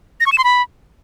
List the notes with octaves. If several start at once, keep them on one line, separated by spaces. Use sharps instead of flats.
A#6
C#6
E7
C6
B5